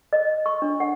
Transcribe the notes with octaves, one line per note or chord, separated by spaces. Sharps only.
D#5
C#6
D4
F#5